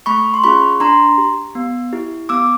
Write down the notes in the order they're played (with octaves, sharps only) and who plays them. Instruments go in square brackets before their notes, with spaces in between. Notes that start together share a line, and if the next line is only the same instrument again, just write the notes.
[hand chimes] A3 B5 C#6
C6
C#4 F4 G#4 B5 C#6
D4 A#5 C6
G4
B3
E4 G4
B3 D6 E6